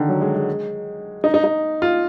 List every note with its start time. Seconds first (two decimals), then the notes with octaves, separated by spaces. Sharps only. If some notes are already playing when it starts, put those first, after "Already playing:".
Already playing: D3 D#3
0.09 F#3
0.21 G#3
0.35 G#3
1.24 D#4
1.34 D#4
1.44 D#4
1.82 F4